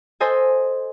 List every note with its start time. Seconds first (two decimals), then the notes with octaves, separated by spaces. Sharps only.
0.20 A4 C5 D#5 G#5